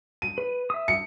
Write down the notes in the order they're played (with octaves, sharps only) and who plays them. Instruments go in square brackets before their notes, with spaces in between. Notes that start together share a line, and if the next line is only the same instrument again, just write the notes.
[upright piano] D#7
[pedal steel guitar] B4
E5 D#6
[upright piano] C#7